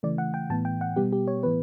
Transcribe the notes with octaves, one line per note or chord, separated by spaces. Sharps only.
C#3 E3 A3 D5
F#5
G5
A2 E3 B3 A5
G5
F#5
B2 G3 B3 G4
G4
C#5
A2 E3 B3 B4